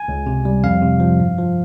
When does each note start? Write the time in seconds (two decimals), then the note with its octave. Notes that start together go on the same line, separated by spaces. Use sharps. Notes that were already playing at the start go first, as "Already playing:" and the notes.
Already playing: G#5
0.08 C#2
0.26 C3
0.45 G3
0.64 F2 F5
0.82 C3
1.00 F3
1.20 G2
1.38 F3